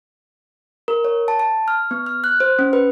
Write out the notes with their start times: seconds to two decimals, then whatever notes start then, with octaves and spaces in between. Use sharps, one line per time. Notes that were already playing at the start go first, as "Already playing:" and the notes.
0.88 A#4
1.05 C#5
1.28 A5
1.39 A5
1.68 F6
1.91 B3
2.06 F6
2.24 F#6
2.40 C5
2.59 C#4
2.73 B4